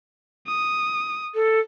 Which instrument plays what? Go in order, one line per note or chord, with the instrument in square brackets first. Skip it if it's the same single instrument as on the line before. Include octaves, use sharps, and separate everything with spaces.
[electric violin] D#6
[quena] A4